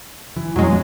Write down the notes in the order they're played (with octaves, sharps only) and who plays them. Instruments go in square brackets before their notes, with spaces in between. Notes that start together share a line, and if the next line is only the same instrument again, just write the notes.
[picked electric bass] E3
[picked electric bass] F2 B2 [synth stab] F#3 G#3